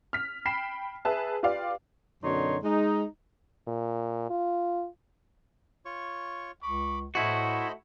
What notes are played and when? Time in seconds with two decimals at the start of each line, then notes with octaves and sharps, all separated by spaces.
0.13 F6 B6
0.45 G5 B5 B6 C7 E7
1.05 G#4 B4 E5 A5
1.43 F4 G4 B4 D5 F5
2.24 F#2 B2 D3 D#4 C#5 C6
2.64 G#3 D#4
3.67 A#2
4.30 F4
5.85 F4 C#5 C#6
6.63 C#2 B5 C#6 D6
7.15 A2 A3 E4 F#4 C5 D#5 B5